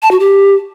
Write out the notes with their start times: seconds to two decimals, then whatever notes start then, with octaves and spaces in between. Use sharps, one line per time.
0.03 A5
0.11 F#4
0.20 G4